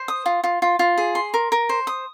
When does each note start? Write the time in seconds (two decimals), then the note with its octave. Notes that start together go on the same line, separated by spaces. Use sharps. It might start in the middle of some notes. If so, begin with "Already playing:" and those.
Already playing: C5
0.08 D#6
0.26 F4
0.44 F4
0.62 F4
0.79 F4
0.98 G#4
1.15 C6
1.34 A#4
1.52 A#4
1.69 C5
1.87 D#6